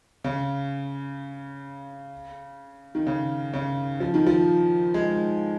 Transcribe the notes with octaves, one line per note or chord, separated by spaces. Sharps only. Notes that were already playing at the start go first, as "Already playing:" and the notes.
C#3
D#3
C#3
C#3
F3
D#3
F3
G#3